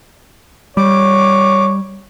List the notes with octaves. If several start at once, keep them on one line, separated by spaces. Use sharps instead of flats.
G3 C#5 D6